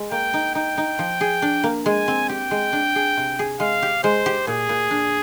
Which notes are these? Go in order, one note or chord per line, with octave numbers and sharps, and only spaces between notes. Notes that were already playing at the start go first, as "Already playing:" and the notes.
Already playing: G#3
A#3 G5
D#4
D#4 G5
D#4
F3
G#4
D4
A#3
G#3 G#5
C4
G4 G5
G#3
D4
G#4
C3
G#4
G#3 F5
G4
G#3 C5
G4
A#2 G#4
A#2
D4